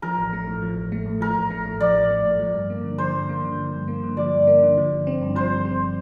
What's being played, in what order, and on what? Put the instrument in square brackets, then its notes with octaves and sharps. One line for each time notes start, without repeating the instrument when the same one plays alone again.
[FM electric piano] F3 [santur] A#4
[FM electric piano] A1
A3
A2
F3
A1
A3
A2
[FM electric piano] F3 [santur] A#4
[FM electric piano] A1
A3
A2
[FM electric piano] F3 [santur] D5
[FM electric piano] A1
A3
A2
F3
G2
A#3
D3
[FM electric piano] F3 [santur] C5
[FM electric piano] G2
A#3
D3
F3
G2
A#3
D3
[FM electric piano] F3 [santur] D5
[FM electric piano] G2
A#3
D3
F3
G1
C4
G2
[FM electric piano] F3 [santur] C5
[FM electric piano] G1
C4